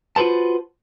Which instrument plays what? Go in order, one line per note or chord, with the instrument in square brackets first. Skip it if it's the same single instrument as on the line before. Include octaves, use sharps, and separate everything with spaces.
[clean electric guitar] F4 F#4 B4 C5 A5